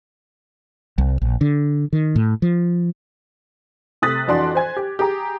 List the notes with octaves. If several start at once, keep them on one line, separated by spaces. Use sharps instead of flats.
C2
A#1
D3
D#3
A2
F3
C3 A3 D#6 F#6 A6 B6
F2 E3 D4 F#4 C6 F#6
C5 G#5 G#6
G4
G4 G#4 A#5